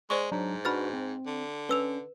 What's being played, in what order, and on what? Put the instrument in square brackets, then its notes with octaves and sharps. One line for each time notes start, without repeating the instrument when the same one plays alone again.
[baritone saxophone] G#3 [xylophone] C5 D5 C#6
[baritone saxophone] G#2 [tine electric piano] F#3 D4 A#5
[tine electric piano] D4 F#4 B4 [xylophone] B5 F6 A6
[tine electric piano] C4
[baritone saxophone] D3
[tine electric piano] C#4 [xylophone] B4 E6 F7